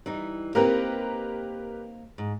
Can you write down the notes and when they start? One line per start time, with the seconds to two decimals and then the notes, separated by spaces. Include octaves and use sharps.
0.06 E3 G3 D#4
0.55 A#3 C4 D#4 G4 A#4 B4
2.18 G#2